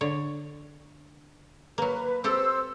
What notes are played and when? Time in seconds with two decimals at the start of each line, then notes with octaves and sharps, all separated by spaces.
0.01 D3 C#5
1.78 F#3 A#3 B4
2.24 C4 G4 A4 C5 E6